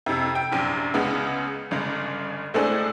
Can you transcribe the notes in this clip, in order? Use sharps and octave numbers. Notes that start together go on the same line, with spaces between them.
F2 C3
G5
A#1 F#2 C3
C#2 C#3 G#3 B3
G1 C#3 G#3
A2 G#3 A3 C4 D4 G#4